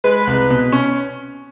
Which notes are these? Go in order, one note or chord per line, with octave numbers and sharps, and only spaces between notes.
G#3 B4
C2
B2
C#4